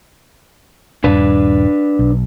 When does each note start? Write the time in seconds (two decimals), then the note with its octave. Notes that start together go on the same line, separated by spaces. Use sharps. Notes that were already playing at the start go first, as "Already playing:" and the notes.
1.04 D#1 G2 D4 B4
1.99 B1